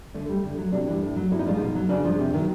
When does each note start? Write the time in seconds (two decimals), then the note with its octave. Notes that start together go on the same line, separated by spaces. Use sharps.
0.14 D3 A3
0.29 G3
0.44 D3
0.58 F#3
0.72 C3 D4
0.87 E3 G3
1.02 A2
1.16 F#3
1.31 A2 E4
1.39 D#4
1.46 F3 G#3 D4
1.55 D#4
1.60 B2
1.75 F#3
1.89 C#3 D4
2.04 F3 G#3
2.19 C3
2.33 D#3 F#3